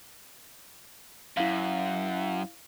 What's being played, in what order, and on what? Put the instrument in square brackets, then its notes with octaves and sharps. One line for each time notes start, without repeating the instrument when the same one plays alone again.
[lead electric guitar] F#2 [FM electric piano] E4 F5